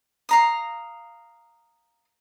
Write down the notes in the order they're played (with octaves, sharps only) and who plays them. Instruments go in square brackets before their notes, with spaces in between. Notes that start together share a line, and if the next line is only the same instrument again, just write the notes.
[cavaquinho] F5 A#5 D#6